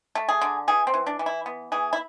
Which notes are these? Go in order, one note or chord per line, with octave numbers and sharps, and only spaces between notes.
A3
G#4
D3
E3 G#4
C4
E3
D4
E3
E4
B3
E3 G#4
E4